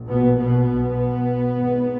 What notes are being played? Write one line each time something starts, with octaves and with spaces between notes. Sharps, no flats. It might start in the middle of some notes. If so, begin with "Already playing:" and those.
Already playing: A#1
B2 B3
B2 B3
B1 B2
G#1 G#2